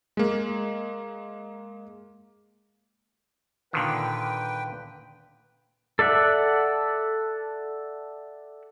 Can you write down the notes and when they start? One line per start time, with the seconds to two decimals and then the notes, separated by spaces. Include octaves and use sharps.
0.17 G#3 A#3
3.73 A#2 D3 D#3 B4 G5
5.99 A4 D5 E5 F#5